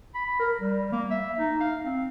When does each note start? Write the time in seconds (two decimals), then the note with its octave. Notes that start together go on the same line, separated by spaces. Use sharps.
0.15 B5
0.39 A#4
0.61 G3
0.92 A#3
1.11 E5
1.38 D#4
1.60 F5
1.84 C4